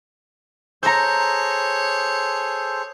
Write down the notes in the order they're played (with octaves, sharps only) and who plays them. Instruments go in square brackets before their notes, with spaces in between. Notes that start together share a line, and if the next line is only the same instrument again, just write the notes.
[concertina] G#4 A4 C5 [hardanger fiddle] C#5 [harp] A#5 G6